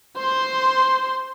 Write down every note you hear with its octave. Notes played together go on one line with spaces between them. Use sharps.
C5 C6